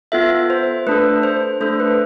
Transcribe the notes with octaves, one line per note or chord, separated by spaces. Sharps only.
B3 F4 A4 E5
C5
A3 D4 A4 B4
C5
A3 D4 A4 C5
B4